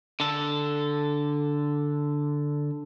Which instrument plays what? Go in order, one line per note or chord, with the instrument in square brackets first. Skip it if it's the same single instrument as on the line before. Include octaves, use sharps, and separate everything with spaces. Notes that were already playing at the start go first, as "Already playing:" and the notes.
[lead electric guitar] D3 A4